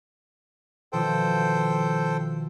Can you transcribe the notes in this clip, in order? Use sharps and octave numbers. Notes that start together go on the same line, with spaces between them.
B2 D#3 F3 A4 C5 G5